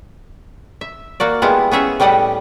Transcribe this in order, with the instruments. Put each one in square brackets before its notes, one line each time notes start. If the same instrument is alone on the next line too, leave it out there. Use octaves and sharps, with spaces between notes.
[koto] E5
A#3 F#4 D5
G3 G#3 B3 E4 F4
B3 C#4 G#4 E5
A2 G3 G4 D#5 F#5